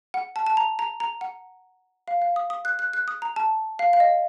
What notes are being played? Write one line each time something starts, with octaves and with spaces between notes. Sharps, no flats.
F#5
A5
A5
A#5
A#5
A#5
F#5
F5
F5
D#6
D#6
F#6
F#6
F#6
D#6
A#5
A5
F5
F5
D#5